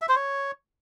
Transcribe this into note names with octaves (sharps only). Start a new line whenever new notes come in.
E5
C5
C#5